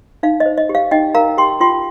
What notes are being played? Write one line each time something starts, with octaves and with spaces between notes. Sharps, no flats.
D#4 F5
D#5
C5
D#5
G4
F5
D#4 D#5 G5
A#4 F5 A#5
G4 G5 C6
F4 G5 C6